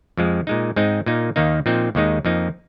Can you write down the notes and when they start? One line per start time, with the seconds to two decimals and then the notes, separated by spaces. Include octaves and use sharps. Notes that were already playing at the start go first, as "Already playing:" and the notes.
0.17 F2 F3 G#3
0.47 A#2 G#3 D#4
0.76 G#2 G#3 C4 D#4
1.06 A#2 A#3 D#4
1.36 D#2 D#3 A#3 D#4
1.66 A#2 F3 C4 D#4
1.95 D#2 D#3 G#3 D#4
2.25 F2 F3 A#3 D#4